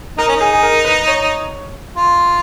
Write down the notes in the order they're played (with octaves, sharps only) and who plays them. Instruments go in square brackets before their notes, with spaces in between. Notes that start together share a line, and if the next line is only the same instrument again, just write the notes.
[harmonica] D#4 [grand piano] A#4
[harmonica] C#4
[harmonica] D#4 [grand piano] G#4
[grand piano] G#4
A#4
B4
C#5
[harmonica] F4